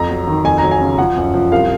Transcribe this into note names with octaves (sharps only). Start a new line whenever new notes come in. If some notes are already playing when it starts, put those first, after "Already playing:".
Already playing: F2 A#5
F#3
D#3
F2 G#5
F#3 A#5
G#5
C#3
F3 F#5
F#2
F3
C2 F5